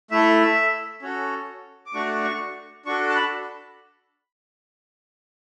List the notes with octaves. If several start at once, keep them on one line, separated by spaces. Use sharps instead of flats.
A3 E4 A4 E5
C#4 F#4 A4
D6
A3 D4 F#4 C#6
C#6
D4 F#4 A4 C#6
A5
B5